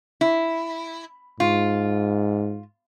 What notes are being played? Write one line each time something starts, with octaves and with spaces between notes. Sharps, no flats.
E4
G#2 F4